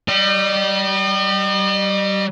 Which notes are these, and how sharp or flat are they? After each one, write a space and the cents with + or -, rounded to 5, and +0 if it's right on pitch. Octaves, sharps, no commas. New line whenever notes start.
G3 -25 D#5 -45